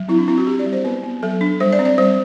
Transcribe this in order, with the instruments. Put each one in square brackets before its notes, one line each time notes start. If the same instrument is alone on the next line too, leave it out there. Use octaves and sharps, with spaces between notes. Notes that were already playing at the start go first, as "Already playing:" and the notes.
Already playing: [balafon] F#3
C4 E4
D4
C4 E4
F#4
C4 G4
D5
G3
C5
B3 B4
B3
F#3 A4
D4
G3 C5
D5
C4
D5
G3 C5